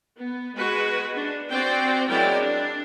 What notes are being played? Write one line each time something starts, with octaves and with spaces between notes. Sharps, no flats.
B3
G#3 F#4 B4
D4
C4 F#4 C5 D5 G5
F#3 G#3 E4 A#4 D5 G5
D4